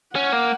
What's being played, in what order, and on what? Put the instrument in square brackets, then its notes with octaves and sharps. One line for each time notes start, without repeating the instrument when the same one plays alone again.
[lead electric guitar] C#4 [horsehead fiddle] F#5
[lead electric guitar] A#3